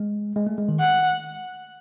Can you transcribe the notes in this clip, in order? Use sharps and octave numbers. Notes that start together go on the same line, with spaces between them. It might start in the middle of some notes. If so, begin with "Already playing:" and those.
Already playing: G#3
G#3
A3
G#3
D#3
F#5